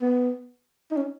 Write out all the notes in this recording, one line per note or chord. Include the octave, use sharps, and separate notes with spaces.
B3
D#4
C#4